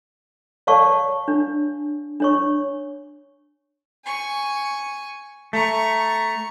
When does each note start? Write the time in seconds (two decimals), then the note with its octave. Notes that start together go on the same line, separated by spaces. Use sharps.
0.67 C#5 D5 F5 A5 C#6
1.28 D4
2.20 D4 C#5 C#6
4.04 G#5 C#6
5.53 A3 A#5 C#6